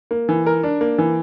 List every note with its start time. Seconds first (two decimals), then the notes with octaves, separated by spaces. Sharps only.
0.11 A#3
0.29 E3
0.46 A#4
0.63 D4
0.81 A#3
0.98 E3